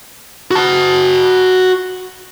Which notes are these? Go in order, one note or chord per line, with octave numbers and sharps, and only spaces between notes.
F#4 A5